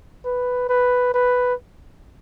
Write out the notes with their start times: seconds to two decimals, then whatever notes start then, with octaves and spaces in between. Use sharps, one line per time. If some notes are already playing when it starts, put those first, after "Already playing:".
0.25 B4
0.69 B4
1.14 B4